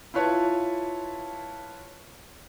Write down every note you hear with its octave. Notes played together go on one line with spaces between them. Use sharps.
E4 F4 B4 C#5 A5